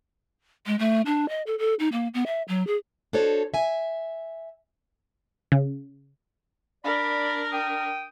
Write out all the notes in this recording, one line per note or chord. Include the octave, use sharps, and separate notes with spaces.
G#3
A3
D4
D#5
A4
A4
D#4
A#3
B3
E5
F#3
G#4
D4 F#4 A4 C5 C#5
E5 G#5
C#3
D4 A#4 D5 B5
G5 D#6